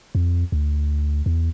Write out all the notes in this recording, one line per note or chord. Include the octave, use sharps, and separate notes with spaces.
F2
D2
E2